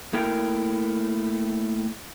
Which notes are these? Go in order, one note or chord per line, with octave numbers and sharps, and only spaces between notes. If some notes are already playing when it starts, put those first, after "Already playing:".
A3 A#3 E4 A#4 G5